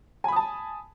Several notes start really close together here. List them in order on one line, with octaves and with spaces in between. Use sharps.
G#5 B5 D#6 A5